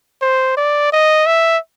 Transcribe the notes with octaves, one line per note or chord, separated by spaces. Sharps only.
C5
D5
D#5
E5